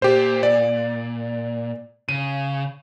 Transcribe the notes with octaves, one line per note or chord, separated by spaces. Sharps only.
A#2 G4 C5
D5
C#3 D#7